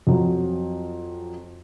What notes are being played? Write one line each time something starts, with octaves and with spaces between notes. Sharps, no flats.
F2 F#3